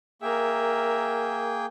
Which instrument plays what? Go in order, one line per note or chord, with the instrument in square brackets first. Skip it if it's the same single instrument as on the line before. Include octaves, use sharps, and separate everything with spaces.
[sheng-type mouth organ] A#3 G#4 G5 [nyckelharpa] A#4 E5